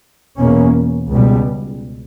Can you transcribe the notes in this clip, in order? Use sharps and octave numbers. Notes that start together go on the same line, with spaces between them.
E2 B2 A#3 C#4
C#2 B2 G3